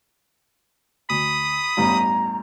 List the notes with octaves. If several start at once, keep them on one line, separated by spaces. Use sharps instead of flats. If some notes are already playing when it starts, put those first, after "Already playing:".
D2 B5 D#6
A1 E2 G2 A#5